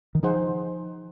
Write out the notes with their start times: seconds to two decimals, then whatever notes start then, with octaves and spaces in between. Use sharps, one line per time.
0.15 D#3
0.23 F3 D#4 G#4 C5 F#5